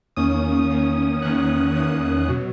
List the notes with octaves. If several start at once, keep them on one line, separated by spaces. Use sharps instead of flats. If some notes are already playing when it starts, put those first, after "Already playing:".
E2 D#3 A#3 C#4 D#6
E2 D#3 A#3 C#4
E2 D#3 A#3 C#4 F#6
E2 D#3 A#3 C#4 D#6
B2 F#3